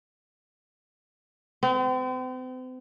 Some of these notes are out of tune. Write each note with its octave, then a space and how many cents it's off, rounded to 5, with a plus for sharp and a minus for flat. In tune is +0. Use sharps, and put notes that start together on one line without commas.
C4 -40